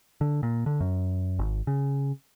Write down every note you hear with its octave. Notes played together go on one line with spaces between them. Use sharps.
D3
A#2
D3
F#2
G#1
C#3